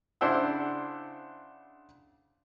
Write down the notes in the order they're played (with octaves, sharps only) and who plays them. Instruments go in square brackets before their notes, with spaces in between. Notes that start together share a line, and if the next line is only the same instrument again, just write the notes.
[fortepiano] C#3 D4 E4 C5 F#5 E6